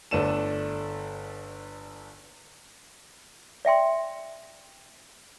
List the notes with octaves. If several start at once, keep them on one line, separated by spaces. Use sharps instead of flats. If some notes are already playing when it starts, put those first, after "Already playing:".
G1 A3 D4 A4 D#7 E7
D5 E5 G5 C6